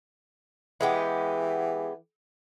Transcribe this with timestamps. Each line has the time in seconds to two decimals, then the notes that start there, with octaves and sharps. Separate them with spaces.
0.81 E3 G#3 B3 G4